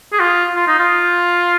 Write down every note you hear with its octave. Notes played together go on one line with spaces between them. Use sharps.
G#4
F4
F4
D#4
F4